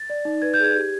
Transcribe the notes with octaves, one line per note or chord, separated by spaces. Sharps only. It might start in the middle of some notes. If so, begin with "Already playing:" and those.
Already playing: A6
D5
D#4
B4 G#6
G6
G#4 G#6
G4